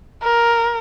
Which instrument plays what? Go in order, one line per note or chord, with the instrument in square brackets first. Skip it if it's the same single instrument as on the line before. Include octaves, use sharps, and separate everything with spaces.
[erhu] A#4